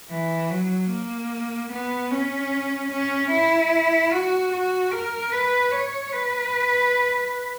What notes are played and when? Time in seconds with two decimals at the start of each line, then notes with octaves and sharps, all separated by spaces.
0.11 E3
0.50 F#3
0.91 A#3
1.71 B3
2.11 C#4
2.92 C#4
3.31 E4
4.12 F#4
4.52 F#4
4.92 A#4
5.32 B4
5.72 C#5
6.12 B4